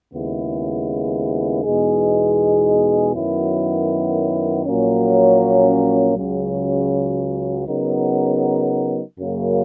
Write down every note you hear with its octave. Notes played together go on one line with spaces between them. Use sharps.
D#2 C#3 G#3 B3 E4
E2 B2 G#3 D#4 G#4
F#2 D#3 F#3 B3 E4
A#1 A#2 F#3 A#3 C#4
C#2 C#3 F#3
C#3 F#3 B3 D#4 A#4
F#2 C#3 F#3 A#3